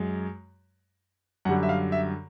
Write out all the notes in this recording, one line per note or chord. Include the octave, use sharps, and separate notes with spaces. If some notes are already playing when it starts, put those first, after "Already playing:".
Already playing: F#2 G#3
F#2 D3 G3 F#5
E5
F5
E5